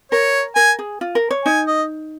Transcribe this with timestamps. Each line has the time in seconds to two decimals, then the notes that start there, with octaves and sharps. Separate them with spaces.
0.11 A#4 C#5
0.56 A#4 G#5
0.79 G#4
1.01 F4
1.15 A#4
1.31 C#5
1.45 D#4 G#5
1.67 D#5